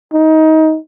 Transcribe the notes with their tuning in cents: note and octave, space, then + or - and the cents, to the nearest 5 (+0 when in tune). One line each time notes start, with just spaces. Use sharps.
D#4 +20